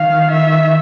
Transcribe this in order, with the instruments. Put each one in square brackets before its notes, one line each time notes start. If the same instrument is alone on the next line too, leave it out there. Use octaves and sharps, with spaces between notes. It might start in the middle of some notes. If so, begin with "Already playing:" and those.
Already playing: [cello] D#3 [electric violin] F5
[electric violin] E5